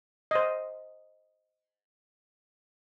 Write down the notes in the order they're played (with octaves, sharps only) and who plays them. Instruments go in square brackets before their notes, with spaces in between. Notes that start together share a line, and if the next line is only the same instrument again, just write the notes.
[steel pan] C5 D#5